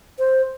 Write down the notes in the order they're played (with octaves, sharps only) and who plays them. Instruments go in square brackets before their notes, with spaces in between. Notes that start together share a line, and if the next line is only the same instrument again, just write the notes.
[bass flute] C5